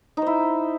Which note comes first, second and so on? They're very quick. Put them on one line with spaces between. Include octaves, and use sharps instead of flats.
D#4 C5 E4